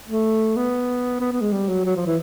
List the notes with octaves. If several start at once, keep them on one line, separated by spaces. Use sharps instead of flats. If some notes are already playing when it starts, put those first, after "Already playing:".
A3
B3
B3
B3
G#3
G3
F#3
F#3
F3
E3